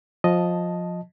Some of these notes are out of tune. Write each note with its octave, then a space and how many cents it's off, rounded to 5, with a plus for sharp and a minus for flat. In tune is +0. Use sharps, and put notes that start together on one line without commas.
F3 +20 D#5 +0 A5 -5